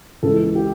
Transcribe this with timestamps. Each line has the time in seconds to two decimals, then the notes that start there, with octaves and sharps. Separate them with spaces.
0.23 C#2 C#3 E3 A4
0.55 G4